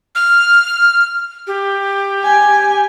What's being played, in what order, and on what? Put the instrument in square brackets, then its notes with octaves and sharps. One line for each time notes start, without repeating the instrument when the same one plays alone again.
[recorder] F6
G4
[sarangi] G#5